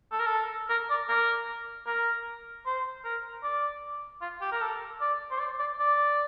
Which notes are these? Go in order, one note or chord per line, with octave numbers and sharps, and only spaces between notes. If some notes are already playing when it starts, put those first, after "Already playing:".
A4
A#4
A4
A#4
D5
A#4
A#4
C5
A#4
D5
F4
G4
A#4
A4
D5
C5
D5
D5
D5